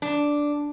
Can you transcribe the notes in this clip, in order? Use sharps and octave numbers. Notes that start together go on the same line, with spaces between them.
D4